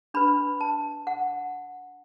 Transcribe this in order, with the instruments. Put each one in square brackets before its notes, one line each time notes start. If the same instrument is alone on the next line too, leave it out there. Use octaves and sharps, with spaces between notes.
[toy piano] D4 B4 B5
A5
F#5